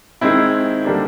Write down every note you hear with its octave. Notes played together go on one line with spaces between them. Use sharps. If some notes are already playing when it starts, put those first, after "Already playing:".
D#3 G#3 C4 E4
D3 G3 A#3 D4